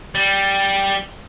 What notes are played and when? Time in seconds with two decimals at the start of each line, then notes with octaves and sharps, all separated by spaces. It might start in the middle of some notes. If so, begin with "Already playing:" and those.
0.15 G3